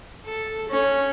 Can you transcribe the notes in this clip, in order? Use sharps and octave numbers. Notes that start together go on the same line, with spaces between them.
A4
C#4